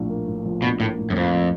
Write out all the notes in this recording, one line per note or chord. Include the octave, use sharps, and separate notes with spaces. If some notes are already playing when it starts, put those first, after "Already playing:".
Already playing: A#1 A2 F3
A#3
A2
F3
A#1 B2
A2 A#3
A2
F#2
F2 F3